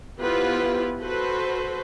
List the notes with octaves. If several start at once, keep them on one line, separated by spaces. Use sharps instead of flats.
B3 E4 F4 G4 B4 C5
F#4 A4 B4 C5